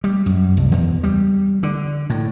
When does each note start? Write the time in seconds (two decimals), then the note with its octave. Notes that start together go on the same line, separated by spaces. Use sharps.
0.04 G3
0.26 F#2
0.57 C2
0.72 E2
1.03 G3
1.63 D3
2.10 A2